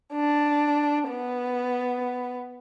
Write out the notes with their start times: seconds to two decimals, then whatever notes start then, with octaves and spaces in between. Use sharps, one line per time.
0.12 D4
1.09 B3